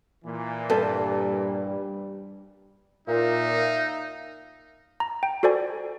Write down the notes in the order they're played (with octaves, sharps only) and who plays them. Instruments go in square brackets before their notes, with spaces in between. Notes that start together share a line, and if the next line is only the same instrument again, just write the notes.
[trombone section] A#2 E3
[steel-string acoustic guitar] G2 [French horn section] G3 [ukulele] A4 B4 C5
[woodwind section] A#2 [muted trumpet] D#4 [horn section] E5 F5
[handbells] A#5
G5
F#4 A4 C5 D5 G#5